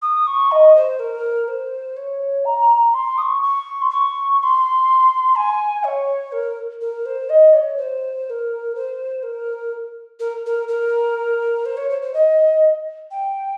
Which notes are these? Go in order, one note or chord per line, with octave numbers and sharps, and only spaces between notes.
D#6
C#6
D#5
C5
A#4
C5
C#5
A#5
C6
D#6
C#6
C#6
C6
C#6
C#6
C6
G#5
C#5
A#4
A#4
C5
D#5
C#5
C5
C5
A#4
C5
A#4
A#4
A#4
A#4
C5
C#5
C5
C5
D#5
G5